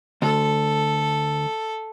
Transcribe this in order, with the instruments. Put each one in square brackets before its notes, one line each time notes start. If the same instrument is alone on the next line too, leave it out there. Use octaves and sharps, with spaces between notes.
[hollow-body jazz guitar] D2 [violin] A4